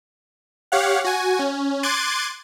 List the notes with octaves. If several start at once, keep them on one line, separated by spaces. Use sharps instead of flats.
G4 C#5 F5 F#5
F#4 G#5
C#4
C6 D6 F#6 G#6 A6 D#7